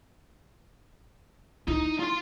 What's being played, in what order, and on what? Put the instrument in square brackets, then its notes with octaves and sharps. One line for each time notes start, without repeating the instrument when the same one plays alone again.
[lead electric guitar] D#4 [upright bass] E4
[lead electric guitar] F4 C6